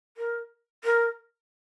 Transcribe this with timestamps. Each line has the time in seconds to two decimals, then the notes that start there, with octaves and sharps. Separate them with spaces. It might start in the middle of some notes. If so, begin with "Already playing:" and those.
0.17 A#4
0.84 A#4